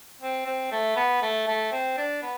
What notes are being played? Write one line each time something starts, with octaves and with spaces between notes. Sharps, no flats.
C4
C4
A3
B3
A3
A3
C4
D4
B3